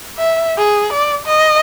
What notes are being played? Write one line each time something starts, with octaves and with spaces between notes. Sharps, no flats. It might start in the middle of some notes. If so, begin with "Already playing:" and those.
E5
G#4
D5
D#5